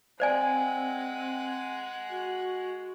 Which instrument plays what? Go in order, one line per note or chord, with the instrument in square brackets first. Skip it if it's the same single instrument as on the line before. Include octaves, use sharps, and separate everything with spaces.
[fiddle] G#3 F#5 [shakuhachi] C4 [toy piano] C5 D5 G#5
[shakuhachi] F#4